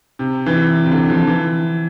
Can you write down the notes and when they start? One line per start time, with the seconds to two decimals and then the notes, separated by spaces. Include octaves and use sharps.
0.19 C3
0.46 E3
0.85 C3
0.91 D3
1.10 F3
1.27 E3